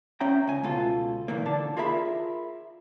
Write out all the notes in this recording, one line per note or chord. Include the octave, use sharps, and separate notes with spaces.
C#4 E5 G5 A#5
C#2 G#5
C#2 B2 F4 A4
A#2 D#3 E3 A#3
D3 D4 A5
F4 G#4 A#4 E5 G#5 B5